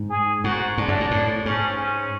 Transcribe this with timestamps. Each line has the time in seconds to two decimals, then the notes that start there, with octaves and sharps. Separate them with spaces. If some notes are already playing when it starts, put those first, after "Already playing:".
Already playing: G#2
0.10 G#4
0.44 G#2 F#4
0.77 G#2 D4
0.88 F#2
1.00 G#2
1.11 A2
1.45 G#2 C#4
1.78 C#4